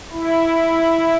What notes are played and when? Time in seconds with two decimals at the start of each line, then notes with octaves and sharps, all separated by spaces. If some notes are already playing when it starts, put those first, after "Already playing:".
0.12 E4